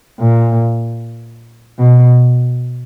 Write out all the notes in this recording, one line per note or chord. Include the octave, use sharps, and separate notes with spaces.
A#2
B2